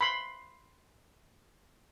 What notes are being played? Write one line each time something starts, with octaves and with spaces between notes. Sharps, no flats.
B5 C6